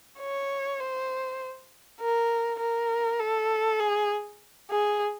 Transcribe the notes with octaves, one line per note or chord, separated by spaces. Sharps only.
C#5
C5
A#4
A#4
A4
G#4
G#4